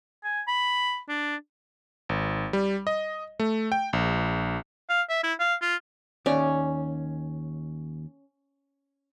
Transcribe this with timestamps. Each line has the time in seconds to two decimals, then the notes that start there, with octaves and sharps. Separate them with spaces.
0.24 G#5
0.48 B5
1.09 D4
2.09 G#1
2.53 G3
2.87 D#5
3.40 A3
3.72 G5
3.93 A#1
4.89 F5
5.09 E5
5.24 E4
5.40 F5
5.62 F4
6.26 D#2 C#4 D5